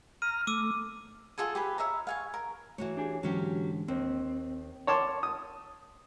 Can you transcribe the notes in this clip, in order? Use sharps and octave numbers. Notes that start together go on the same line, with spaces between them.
A#5 F6 D#7
A3 D6 E6 D#7
F4 G#4 A4 G#5
G4 G#4 B4
C#5 E5 F5 A#5
F5 G#5 C#6
A#4
E3 A3 F#4 C#5
D4 G4 G#4
G#2 D3 E3 F#3 C#4 G4
D#2 C4
C#5 A5 C6 D6
D#6